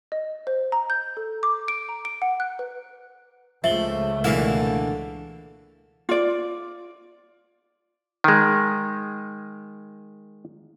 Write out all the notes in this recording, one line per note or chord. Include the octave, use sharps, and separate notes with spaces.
D#5
C5
A#5
G6
A4
D6
D7
A#5
D7
F#5
F#6
B4
C#2 F3 A3 E5 F#7 G7
B2 D3 E3 A#3 E4 F5
F4 D5
D#3 G#3